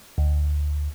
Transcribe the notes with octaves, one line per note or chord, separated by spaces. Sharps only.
D2